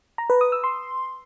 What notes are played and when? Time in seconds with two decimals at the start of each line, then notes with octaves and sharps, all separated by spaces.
0.18 A#5
0.30 B4
0.41 D#6
0.52 E6
0.64 C6